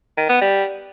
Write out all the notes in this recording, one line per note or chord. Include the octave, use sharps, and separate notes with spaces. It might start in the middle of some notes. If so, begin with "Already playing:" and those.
D#3
B3
G3